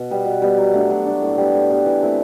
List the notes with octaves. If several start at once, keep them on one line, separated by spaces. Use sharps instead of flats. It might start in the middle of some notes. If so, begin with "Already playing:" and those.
Already playing: B2
G3 B3
B2
G3 B3
F#3
A3 D4
F#3
A3 D4
A2
G3 B3
A2
G3 B3
E3
A3 C4 E4